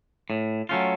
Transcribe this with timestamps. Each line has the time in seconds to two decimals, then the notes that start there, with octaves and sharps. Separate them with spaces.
0.30 A2
0.69 F#3 A3 C#4 F4